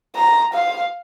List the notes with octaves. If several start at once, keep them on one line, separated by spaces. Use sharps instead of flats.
A#5
F5